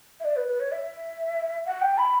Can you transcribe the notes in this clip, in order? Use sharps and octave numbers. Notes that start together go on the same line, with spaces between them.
E5
D5
B4
B4
C#5
E5
F#5
G5
B5